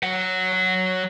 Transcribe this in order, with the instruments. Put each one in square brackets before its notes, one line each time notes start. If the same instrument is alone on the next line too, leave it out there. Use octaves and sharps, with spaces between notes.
[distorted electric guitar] F#3 F#5